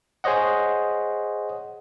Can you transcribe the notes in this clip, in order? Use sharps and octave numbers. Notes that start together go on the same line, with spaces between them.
G#4 C5 C#5 D#5 F#5